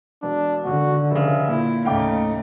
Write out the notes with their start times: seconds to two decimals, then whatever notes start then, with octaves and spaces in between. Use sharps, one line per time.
0.23 E1 D4
0.65 D3 D#3 F#4
1.11 F1 C#3 E5
1.48 A#2 E4
1.85 D#2 A2 C#3 A3 D#4 F5 G5 D6